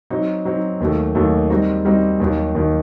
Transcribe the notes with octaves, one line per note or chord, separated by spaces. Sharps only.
F#3 C4 D#4
F#3 C4 D#4
D#2 D#3 F#3 A3
D#2 D#3 F#3 A3
G3 C4 D#4 F#4
G3 C4 D#4 F#4
D#2 D#3 F#3
D#2 D#3 F#3